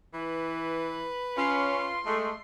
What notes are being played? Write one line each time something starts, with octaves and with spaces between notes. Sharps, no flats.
E3 B4
C#4 F4 C6
G#3 A3